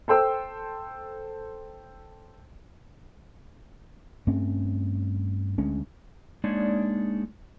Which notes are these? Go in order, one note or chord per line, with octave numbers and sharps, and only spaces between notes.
A4 C5 G5 E6
G2 A3 C4 C#4
D2 G#3 C#4
G#3 A#3 D4 D#4 C#5 D5